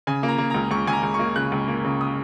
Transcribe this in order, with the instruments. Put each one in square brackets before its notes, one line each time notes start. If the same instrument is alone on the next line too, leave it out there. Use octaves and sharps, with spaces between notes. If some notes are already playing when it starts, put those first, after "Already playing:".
[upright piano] C#3 G#5
A#3
A#5
A#3
C#2 A#5
C#2 C#6
C#2 G#5
A#5
C#2
C#6
A#3
C#3 F#6
C#2
A#3
C#3
D#6